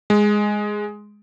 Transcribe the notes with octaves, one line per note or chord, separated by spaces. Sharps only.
G#3